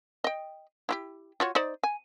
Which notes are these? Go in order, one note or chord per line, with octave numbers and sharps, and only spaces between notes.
D#5 G5
E4 F#4 G4
F4 F#4 C#5
D#4 C5 D5
G#5